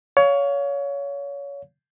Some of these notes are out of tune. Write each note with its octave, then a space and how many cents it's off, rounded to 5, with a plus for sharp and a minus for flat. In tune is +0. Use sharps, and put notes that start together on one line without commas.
C#5 +25 F5 +15